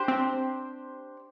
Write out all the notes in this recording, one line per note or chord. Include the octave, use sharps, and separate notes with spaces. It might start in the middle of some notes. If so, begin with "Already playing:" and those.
Already playing: D4 G4 C5
C4